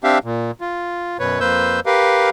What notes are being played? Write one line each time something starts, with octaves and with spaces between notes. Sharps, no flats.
C4 D4 G4 E5 F5
A#2
F4
F#2 B2 B4 C#5
F2 A#3 B4 C5 E6 G6
G4 A#4 B4 F5